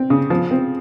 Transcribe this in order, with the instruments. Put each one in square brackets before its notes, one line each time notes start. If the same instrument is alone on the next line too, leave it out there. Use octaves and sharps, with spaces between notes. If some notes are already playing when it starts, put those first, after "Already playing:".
Already playing: [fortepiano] C4
C#3
F3
C4